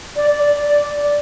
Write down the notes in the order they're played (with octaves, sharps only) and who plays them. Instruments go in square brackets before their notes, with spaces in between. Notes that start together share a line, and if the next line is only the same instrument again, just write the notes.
[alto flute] D5
D5